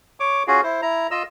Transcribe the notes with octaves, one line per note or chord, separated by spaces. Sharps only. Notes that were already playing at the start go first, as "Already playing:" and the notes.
C#5 D6
C#4 F4 F#4 G#4
E4 C5
E4 A#5
F4 D#5 E6